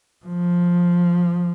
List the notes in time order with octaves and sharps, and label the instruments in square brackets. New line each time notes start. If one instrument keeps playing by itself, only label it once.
[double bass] F3